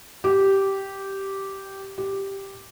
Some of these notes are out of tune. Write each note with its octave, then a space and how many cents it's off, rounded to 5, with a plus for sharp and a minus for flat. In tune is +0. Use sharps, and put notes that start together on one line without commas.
G4 -10
G4 +0